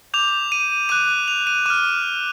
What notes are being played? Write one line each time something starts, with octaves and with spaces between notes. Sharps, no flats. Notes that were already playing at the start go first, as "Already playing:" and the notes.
D6 G6 F7
D#7
D6 F#6 D#7
F7
D#7
D6 F6 D#7